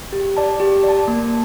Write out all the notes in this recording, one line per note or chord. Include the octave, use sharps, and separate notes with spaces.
G4
D5 A5
G4
D5
A5
A#3